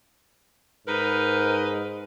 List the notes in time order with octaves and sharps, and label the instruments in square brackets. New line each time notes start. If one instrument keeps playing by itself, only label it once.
[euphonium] G#2 [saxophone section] D#4 A#4 B4